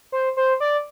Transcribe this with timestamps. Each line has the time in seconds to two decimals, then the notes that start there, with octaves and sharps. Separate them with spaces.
0.12 C5
0.37 C5
0.60 D5